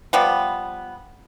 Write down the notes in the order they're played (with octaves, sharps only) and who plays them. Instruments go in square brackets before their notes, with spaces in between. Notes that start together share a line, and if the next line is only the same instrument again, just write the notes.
[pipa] F3 G3 B3